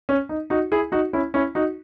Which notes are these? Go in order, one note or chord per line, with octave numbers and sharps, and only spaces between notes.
C#4
D#4
D#4 F#4
E4 G#4
D#4 F#4
C#4 E4
C#4 E4
D#4 F#4